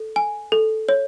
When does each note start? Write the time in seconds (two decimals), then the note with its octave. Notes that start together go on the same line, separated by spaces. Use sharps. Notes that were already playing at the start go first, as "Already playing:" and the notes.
Already playing: A4
0.16 G#5
0.52 A4
0.89 C#5